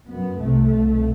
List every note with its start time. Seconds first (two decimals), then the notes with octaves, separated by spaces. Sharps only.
0.09 F#2 B3
0.39 C2 C3 A3
0.71 C2 B2